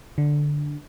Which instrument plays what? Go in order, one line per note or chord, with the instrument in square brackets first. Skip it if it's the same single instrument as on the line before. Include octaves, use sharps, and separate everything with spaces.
[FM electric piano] D3